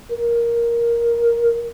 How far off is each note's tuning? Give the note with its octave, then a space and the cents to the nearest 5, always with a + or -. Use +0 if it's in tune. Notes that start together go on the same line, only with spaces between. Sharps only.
A#4 +10